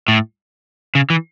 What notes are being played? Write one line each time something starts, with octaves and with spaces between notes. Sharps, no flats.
A2
C#3
E3